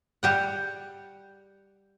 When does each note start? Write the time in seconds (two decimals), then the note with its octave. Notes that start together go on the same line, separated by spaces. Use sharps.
0.23 G3 G4 F#5